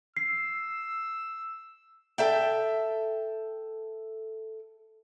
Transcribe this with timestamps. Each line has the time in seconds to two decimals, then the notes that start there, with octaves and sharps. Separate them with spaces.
0.17 E6 C7
2.18 A4 E5 G5